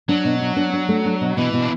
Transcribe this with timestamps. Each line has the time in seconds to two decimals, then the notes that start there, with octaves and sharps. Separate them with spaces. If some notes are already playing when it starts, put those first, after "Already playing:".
0.09 F#3 D4
0.25 B2
0.41 D4
0.56 D4
0.73 D4
0.89 A3
1.05 D4
1.21 B2
1.37 B2 E3
1.53 B2
1.61 D4